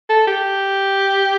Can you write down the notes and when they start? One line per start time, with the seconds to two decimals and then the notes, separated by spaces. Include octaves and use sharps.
0.09 A4
0.27 G4